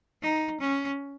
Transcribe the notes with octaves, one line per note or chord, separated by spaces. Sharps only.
D#4
C#4